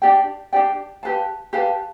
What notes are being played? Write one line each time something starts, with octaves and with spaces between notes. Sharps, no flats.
D4 G4 D5 G5
D4 G4 D5 G5
G4 B4 F5 A5
G4 B4 F5 A5